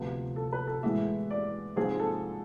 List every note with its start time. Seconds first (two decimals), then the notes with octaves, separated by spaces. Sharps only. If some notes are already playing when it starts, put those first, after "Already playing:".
Already playing: D2 C3 F3 B3
0.36 A4
0.52 B4
0.67 A4
0.83 A2 E3 G#3 B3 E5
1.31 D5
1.76 G#2 F3 G#3 C4 G#4
2.00 A4